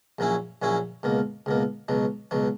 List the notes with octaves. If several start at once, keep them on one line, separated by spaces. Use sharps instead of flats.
A#1 A#2 F#3 C#4 E4
A#1 A#2 F#3 C#4 E4
C#2 B2 A#3
C#2 B2 A#3
C#2 B2 F#3
C#2 B2 F#3